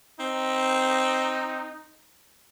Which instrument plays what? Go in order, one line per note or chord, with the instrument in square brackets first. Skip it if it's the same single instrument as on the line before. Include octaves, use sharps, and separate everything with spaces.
[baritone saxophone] C4 [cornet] D#4